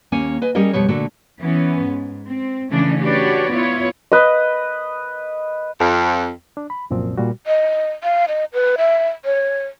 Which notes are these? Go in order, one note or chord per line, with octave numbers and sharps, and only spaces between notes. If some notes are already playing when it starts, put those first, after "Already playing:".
D#2 A#3 C#4 G#5
B4 D#5 G#5
G3 C#4 G4 G#4 A#4 D#5
F2 B2 G3 B3 C#5
A#2 D3 A3 A#3 F#4
E3 B3 C#4
G#2
C4
C#3 E3 A3 C#4 D4
D4 F#4 G4 B4 C#5 D5
B3 E4 F4 C#5
B4 D#5
F2
D4
B5
C2 F#2 A#2 F3 C4
A#2 G3 F#4
D#5
F5
D#5
B4
E5
C#5